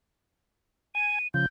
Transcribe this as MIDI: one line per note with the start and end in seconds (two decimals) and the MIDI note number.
0.95 1.19 80
0.95 1.28 99
1.34 1.46 49
1.34 1.46 53
1.34 1.46 91